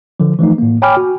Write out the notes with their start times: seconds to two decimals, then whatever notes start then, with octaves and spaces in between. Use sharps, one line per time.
0.20 D3 F3
0.39 E3 F3 A3 D#4
0.58 A2 A#3
0.82 C#5 G5 G#5 B5 D6 F6
0.97 F#4